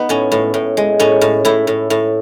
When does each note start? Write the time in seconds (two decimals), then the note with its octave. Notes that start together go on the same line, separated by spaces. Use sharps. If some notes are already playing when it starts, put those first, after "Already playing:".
Already playing: B3 D#4
0.09 A2 C#4
0.32 A2
0.54 A2
0.77 G#3
0.99 A2 C#4
1.21 A2
1.45 A2 E4
1.67 A2
1.90 A2